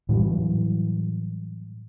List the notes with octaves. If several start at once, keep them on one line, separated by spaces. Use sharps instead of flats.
A2 E3 F#3 G3